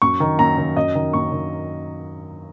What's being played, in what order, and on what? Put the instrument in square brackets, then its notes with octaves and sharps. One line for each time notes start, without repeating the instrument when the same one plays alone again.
[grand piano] F#2 C#6
D#3
F#2 A#5
D#3
F#2 D#5
D#3
F#2 C#6
D#3